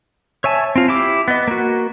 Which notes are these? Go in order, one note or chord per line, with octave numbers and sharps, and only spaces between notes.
C#5 E5 G#5 A5
C4 F4
E4 G4 D6
B3 D#5
A#3 F#4